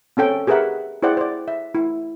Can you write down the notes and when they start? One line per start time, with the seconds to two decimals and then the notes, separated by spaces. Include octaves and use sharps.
0.17 C4 C#4 A4 G5
0.47 G4 G#4 A#4 B4 E5 F#5
1.02 E4 G#4 C5 D5 F#5 G5
1.17 C5 D5
1.48 E5
1.75 E4